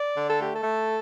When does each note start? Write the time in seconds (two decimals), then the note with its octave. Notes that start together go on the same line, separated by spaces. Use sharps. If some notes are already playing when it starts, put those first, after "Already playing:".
Already playing: D5
0.16 D3
0.29 A4
0.41 A3 G4
0.56 A4
0.64 A3